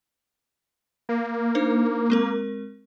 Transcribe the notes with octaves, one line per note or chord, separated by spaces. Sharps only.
A#3
D4 D#4 C5
G#3 C4 A#4